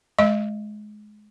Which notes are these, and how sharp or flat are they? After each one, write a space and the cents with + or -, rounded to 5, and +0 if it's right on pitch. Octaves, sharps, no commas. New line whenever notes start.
G#3 +25 D#5 -5